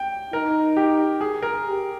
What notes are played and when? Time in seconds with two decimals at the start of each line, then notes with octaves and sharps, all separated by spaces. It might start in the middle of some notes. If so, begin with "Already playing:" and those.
Already playing: G5
0.33 D#4 A#4
0.77 G4
1.21 G#4
1.42 A#4
1.65 G4